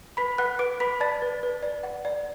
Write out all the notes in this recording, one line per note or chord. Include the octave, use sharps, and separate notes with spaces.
B4 B5 B6
B4 F#5 F#6
B4 D6 D7
B4 B5 B6
D5 A5 A6
B4
B4
D5
F#5
D5